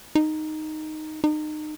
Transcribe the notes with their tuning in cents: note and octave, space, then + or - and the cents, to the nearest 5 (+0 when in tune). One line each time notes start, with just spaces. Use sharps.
D#4 -5
D#4 -30